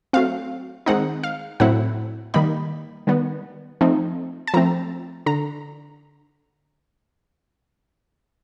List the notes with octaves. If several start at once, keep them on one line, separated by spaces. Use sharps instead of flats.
F#3 A3 C4 F5
D#3 G#3 C4 D#4 F#5
F5
A2 F#3 A3 C4 E4 F#5
D#3 G3 A#3 D#4 B5
D#3 G3 B3
F3 A3 C4 D#4
A5
F3 A3 C4 A#5
D3 A#5